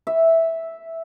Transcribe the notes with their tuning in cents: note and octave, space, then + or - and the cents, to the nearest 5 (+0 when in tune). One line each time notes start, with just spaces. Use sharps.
E5 -5